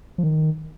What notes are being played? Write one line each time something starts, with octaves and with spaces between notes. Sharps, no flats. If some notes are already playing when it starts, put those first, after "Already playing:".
F3
D#3